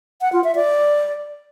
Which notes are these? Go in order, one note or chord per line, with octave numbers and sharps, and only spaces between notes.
F#5
F4
E5
D5